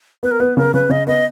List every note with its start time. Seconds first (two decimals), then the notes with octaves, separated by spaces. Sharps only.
0.23 B3 B4
0.31 A#4
0.40 B3 B4
0.57 C#3 A#4
0.74 C#3 B4
0.89 C#3 D#5
1.07 B3 D#5